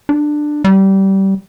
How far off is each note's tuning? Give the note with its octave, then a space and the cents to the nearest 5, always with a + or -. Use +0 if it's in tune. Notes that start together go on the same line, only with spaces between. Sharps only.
D4 +15
G3 -20